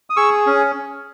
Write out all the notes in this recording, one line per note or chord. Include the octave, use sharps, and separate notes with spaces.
D#6
G#4 C#6 E6
C#4